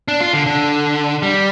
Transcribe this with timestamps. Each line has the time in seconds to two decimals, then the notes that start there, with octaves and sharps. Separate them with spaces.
0.08 D4
0.20 F4
0.33 D3
0.46 D3
1.23 G3